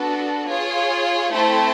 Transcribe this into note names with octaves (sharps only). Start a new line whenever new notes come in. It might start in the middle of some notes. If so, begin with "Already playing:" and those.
Already playing: B3 D4 F#4 A4
F4 G#4 C#5
A3 C4 E4 A4 C5